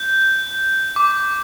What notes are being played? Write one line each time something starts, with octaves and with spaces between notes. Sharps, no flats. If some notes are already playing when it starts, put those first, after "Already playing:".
Already playing: G6
D6